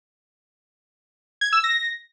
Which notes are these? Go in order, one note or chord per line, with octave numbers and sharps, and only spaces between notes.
G#6
E6
A#6